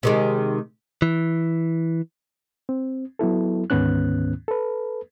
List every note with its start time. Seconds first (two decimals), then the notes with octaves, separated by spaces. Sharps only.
0.03 C3 D#3 G#3
1.02 E3
2.69 C4
3.19 F#3 B3 E4 A4
3.70 D2 G#2 D#3 B3 C#4 F#6
4.48 A4 B4